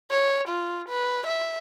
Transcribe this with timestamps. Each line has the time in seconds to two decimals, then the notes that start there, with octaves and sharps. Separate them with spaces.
0.11 C#5
0.48 F4
0.89 B4
1.26 E5